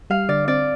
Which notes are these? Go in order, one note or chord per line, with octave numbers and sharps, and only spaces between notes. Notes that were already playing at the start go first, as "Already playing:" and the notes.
G3 F5
D3 D5
C4 D5